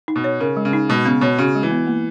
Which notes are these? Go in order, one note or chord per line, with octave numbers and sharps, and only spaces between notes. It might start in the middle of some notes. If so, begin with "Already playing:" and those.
D#4
B2
C#5
C#3 A#4
G#3
C#3
D#4
B2 G#3
C#3 B3
B2 C#5
C#3 F#4
G#3
E3
B3
A#3